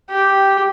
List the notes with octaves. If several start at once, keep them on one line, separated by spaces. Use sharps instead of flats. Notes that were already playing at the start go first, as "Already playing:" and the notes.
G4